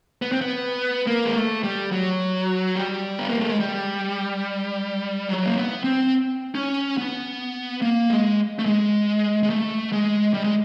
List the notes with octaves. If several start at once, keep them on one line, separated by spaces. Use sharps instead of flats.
B3
C4
B3
A#3
G#3
A3
G3
F#3
G3
B3
A#3
A3
G#3
G3
F#3
A#3
B3
C4
C#4
B3
A#3
G#3
A3
G#3
G#3
A3
G#3
G3
G#3